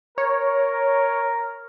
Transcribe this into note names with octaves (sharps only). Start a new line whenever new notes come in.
A#4 C#5